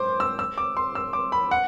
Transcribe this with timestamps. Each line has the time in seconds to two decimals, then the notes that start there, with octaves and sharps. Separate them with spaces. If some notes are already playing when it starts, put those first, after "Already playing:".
Already playing: C5 C6 D6
0.20 E6
0.39 E6
0.58 D6
0.77 C6
0.95 E6
1.13 D6
1.32 B5
1.51 F#5